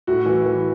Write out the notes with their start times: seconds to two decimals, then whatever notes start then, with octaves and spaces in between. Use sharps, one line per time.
0.07 A2 F#4
0.26 E3
0.46 E3